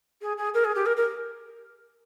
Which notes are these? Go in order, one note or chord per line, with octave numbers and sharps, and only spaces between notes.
G#4
G#4
A#4
G#4
G4
A#4
A#4